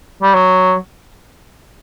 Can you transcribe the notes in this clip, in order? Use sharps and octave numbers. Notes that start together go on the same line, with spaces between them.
G3
F#3